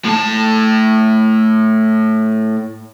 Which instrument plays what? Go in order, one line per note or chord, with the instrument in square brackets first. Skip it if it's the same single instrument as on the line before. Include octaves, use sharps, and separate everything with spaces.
[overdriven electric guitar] A2 A5